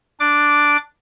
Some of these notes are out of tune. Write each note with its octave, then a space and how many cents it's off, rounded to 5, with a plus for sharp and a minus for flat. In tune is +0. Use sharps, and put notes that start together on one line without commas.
D4 +0 D6 +0